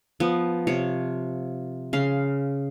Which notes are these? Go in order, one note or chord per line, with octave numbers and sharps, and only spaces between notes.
F3 B3
C3 F4 C#5
C#3 F5 C6